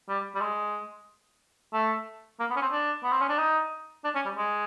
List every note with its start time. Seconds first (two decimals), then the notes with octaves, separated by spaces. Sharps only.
0.08 G3
0.35 G3
0.41 G#3
1.73 A3
2.39 A#3
2.50 B3
2.56 C#4
2.61 C4
2.72 D4
3.03 B3
3.12 C4
3.21 C#4
3.29 D4
3.39 D#4
4.04 D4
4.15 C#4
4.25 G3
4.37 G#3